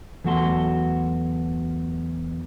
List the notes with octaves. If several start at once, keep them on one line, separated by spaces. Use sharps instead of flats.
E2 F#3 A3 F#4 A5 C6